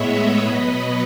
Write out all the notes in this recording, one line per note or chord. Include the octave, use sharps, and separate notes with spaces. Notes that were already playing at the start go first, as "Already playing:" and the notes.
Already playing: A2 G#3 B3 B4 C#5 D#5 E5
B2 F#3 B3